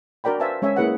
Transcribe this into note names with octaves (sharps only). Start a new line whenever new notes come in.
D4 F#4 A#4 D5 G5 B5
B4 C5 E5 F5 G#5 A5
G#3 C#4 C#5 E5 G#5
A#3 E4 G#4 B4 E5 F#5